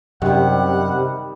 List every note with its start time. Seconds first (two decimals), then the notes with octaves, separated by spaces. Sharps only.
0.22 F#2 C3 D#3 G3 F#5